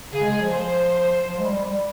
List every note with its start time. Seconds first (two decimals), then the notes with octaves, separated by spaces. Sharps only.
0.13 C#3 G#4
0.21 G#3
0.32 G#3
0.41 F3
0.51 C5
1.27 F3
1.39 G#3
1.46 G3
1.64 G3